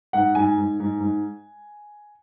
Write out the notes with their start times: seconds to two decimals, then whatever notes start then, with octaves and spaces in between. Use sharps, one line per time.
0.13 G#2 F#5
0.35 G#2 G#5
0.58 G#2
0.80 G#2
1.00 G#2